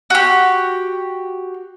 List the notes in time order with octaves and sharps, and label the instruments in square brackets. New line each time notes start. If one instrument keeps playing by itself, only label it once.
[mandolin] F#4 G4